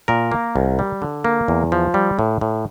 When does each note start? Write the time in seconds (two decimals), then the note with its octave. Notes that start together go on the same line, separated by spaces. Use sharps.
0.08 A#2 A#4
0.32 A#3
0.56 C2
0.79 G3
1.02 D3
1.25 A#3
1.48 E2
1.72 F3
1.94 G3
2.19 A2
2.41 A2